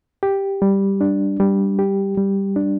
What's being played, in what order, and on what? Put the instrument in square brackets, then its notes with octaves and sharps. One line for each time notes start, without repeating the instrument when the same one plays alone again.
[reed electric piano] G4
G3
D4
G3
G4
G3
D4